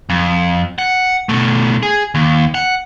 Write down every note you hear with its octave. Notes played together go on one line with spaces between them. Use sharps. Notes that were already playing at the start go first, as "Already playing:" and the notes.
F2
F#5
B2 A3
G#4
D#2
F#5